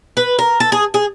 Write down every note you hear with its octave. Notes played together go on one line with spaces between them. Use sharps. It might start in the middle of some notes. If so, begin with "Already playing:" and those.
B4
A#4
A4
G#4
G#4